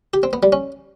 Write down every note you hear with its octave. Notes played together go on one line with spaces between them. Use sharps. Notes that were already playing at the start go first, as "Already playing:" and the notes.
G4
C4
B3
G3
C#4